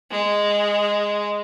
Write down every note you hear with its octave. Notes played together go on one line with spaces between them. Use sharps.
G#3